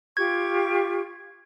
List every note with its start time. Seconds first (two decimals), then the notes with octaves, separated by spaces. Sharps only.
0.17 F4 G4 C#6 G#6